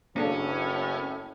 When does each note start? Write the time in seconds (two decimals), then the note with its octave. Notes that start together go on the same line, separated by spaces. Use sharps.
0.16 F#1 A2 A#3 C#4 D4 A4